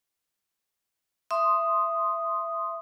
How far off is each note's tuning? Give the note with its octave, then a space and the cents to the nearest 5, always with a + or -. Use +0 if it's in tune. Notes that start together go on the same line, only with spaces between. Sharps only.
E5 +20 C6 +0 D#6 +0